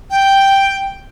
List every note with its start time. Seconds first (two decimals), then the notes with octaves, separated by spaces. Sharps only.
0.10 G5